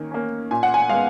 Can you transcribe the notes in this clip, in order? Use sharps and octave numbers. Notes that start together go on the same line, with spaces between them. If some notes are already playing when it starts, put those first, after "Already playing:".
Already playing: D#3 A#3 C#4
A#3 C#4
A#2 G#5
F#5
G#5
G#3 B3 F5